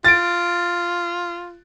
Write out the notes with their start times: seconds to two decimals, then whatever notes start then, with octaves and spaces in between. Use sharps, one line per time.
0.05 F4 A6 D7